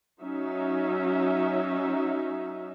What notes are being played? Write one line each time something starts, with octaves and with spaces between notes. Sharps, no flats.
F#3 C#4 D#4 E5